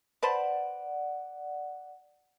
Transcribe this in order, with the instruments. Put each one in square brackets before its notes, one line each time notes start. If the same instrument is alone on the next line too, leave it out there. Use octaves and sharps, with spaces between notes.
[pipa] B4 C5 A5 [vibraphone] D5 F#5